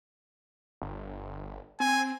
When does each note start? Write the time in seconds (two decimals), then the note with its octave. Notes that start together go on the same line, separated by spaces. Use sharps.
0.82 G1
1.80 C4 G#5